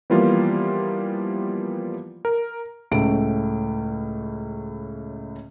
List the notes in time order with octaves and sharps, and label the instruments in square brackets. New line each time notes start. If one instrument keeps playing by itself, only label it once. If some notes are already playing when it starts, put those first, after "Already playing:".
[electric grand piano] E3 F3 G3 A#3 B3 F4
A#4
[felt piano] C#2 A2 A3 C#4 D7